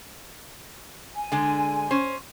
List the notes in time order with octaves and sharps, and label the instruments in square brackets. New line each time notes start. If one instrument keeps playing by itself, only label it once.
[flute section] G#5
[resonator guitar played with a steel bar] D3 G#3
C#4 C5